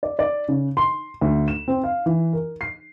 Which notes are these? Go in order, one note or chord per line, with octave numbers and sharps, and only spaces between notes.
D5
D5
C#3
C6
D2
E7
C4
F5
E3
A#4
C7